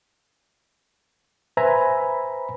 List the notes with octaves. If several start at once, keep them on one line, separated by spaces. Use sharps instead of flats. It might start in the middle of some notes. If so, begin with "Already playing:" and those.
B4 C5 E5 G#5 A#5 B5